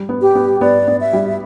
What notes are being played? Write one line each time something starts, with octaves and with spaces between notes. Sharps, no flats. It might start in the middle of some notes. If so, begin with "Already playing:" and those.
Already playing: G3
B3
G4
B3
B3 D5
B3
E5
G3